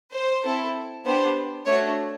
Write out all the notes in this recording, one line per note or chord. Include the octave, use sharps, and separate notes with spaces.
C5
C4 E4 A4
B3 D4 G4 C5
A3 D4 F#4 C#5